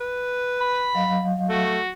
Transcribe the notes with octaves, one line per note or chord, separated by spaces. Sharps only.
B4
B5
F#3 D#5 F5
A3 F#4